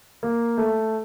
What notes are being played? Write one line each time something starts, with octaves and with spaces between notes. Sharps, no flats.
A#3
A3